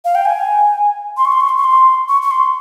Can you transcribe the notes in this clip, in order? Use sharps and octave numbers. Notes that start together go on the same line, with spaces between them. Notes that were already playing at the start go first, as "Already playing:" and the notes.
F5
G5
G#5
C6
C#6
C6
C#6
C6
C#6
C6
C#6
C#6
C6